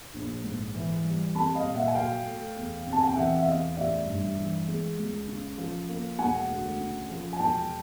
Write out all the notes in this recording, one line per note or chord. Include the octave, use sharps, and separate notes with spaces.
A#1
G#2
E3
G3
C2 A5 B5
D#5 F5
A#2
E5 F#5
G#5
F#3 F5 G5
A3
E2
C3
A5
G#5
G5
E3 E5 F#5
E5
E2 D#5 F5
A1 D5 E5
G2
E3
G#3
C#2
C#3
F3
A#3
E1 F#5 G#5
D2
C#3
F3
G#5
E1 G5 A5